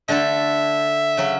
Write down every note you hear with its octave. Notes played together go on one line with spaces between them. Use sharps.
D3 A3 D4 A4 E5
C#3 F#3 C#4